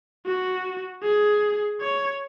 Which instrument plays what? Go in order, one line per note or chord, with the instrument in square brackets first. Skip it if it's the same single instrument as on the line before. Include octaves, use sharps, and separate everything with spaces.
[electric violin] F#4
G#4
C#5